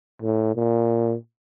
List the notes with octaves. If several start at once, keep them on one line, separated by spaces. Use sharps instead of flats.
A2
A#2